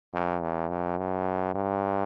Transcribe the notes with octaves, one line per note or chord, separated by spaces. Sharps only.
F2
E2
F2
F#2
G2